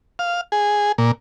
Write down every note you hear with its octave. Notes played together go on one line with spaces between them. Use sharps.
F5
G#4
A#2